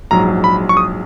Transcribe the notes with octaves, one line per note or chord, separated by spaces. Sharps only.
A#1 G#2 F#3 A#5
B5
C#6
D#6